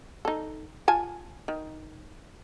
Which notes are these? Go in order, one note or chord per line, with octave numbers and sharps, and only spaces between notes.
D#4 A4
F4 G#5 A5
D#3